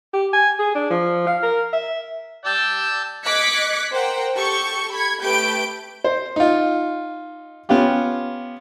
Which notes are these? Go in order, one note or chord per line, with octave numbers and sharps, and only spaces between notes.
G4
G#5
G#4
D4
F3
F5
A#4
E5
D5 G5 A5 E6 G6
D#5 D6 F#6 G#6 B6 C#7
A#4 C5 F#5 G5
G4 A4 C#6 G6 C#7
B5 G#6 C#7
A3 G4 B4 G6 D7
C5
D#4 F4
B3 C#4 F4 G4